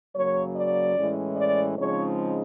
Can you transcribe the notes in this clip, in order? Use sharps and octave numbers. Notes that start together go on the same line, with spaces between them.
F#2 C#3 F#3 A#3 C#5
D5
A2 E3 G#3 C#4
D5
C#3 F3 G#3 C4 D#4 C#5